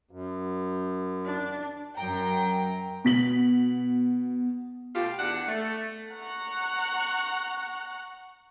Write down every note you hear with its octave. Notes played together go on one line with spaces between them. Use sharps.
F#2
D4
F#2 G5 A#5
B2 B6 F#7
B2 A3 F4 G4
E2 D4 F#5
A3
F#5 A#5 C#6